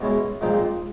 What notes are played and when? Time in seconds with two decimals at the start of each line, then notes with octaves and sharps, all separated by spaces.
0.01 B2 G#3 C#4 E4
0.41 A#2 F3 G#3 C4 D#4